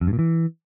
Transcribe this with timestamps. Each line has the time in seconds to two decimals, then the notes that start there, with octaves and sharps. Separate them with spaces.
0.01 F2
0.07 G2
0.13 A#2
0.19 E3